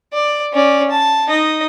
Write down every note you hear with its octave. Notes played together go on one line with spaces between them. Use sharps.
D5
C#4 D5
A5
D#4 D#5